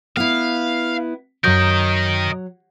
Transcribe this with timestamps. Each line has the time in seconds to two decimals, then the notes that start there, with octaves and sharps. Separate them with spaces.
0.17 B3 E4 F5
1.44 F#2 F#3 A#4 D#5 G6